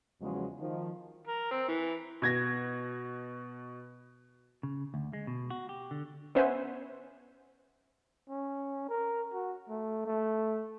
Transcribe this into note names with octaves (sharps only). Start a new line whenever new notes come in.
E2 C#3 F3 F#3 G#3
D#3 F3
A#4
C4
E3
B2 G#6 A#6
C#3
D2
G#3
B2
F#4
G4
D3
B3 C#4 C5 E5 F#5 G#5
C#4
A#4
F#4
A3
A3